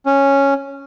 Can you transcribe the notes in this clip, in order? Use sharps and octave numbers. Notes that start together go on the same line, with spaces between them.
C#4